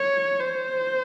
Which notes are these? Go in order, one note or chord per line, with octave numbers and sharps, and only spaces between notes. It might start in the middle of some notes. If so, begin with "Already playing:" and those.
Already playing: C#5
C5